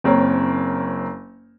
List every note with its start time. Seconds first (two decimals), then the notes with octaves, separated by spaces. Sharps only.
0.04 F#1 C4 A#4 C#5